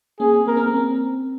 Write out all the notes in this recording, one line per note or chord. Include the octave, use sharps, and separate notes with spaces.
A#3 C#4 G#4
C4
A#3 A#4
C4
A#3 C#4
C4